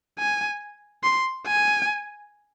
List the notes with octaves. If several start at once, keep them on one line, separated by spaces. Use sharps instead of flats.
G#5
C6
G#5